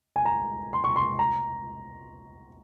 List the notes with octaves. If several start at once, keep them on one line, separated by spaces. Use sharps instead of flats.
G#5
A#5
C6
C#6
C6
A#5